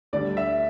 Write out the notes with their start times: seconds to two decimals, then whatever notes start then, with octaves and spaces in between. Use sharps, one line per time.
0.13 D2 D3 G3 D5
0.37 E5